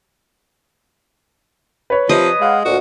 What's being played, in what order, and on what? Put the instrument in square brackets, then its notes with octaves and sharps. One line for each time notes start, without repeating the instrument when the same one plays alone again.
[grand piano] B4 C#5
[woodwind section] C3 [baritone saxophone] F3 [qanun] D#5
[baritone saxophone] G#3 [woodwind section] F5 F#5
[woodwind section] D2 A#2 [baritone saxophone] F#4